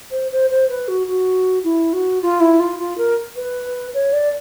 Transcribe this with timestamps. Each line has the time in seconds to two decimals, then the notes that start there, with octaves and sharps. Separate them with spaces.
0.11 C5
0.31 C5
0.50 C5
0.69 B4
0.88 F#4
1.07 F#4
1.64 E4
1.93 F#4
2.22 F4
2.40 E4
2.60 F4
2.79 F4
2.98 A#4
3.36 B4
3.94 C#5
4.13 D5